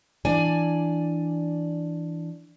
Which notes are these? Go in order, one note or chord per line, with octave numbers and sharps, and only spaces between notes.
E3 D4 D5 G#5